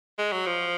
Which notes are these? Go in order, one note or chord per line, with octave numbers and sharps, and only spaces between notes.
G#3
F#3
F3